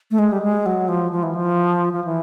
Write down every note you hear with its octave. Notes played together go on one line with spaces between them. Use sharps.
A3
G#3
G3
G#3
F#3
F3
F3
E3
F3
F3
E3